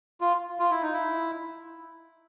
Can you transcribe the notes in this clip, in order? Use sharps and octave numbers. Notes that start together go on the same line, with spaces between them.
F4
F4
E4
D#4
E4